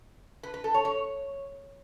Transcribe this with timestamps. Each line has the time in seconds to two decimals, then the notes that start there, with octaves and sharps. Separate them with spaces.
0.43 B4
0.54 B4
0.64 A4
0.74 C#5
0.85 C#5